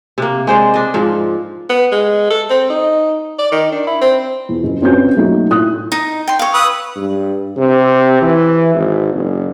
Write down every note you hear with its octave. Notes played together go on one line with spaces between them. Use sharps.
C3 A#3
G#3 C5 D5
D4 D#5
G#2 F3
B3
G#3
A4
C4
D#4
D5
D#3
D4
E4
C4
E2
F#1
G1 C4 C#4 F#4 B4 G6
F#3 A3 A#3 D#4 F#4
A2 D#6 F#6
D#4
G5 C6
C#5 F5
B4 D#6 E6
G2
C3
E3
G#1
F#1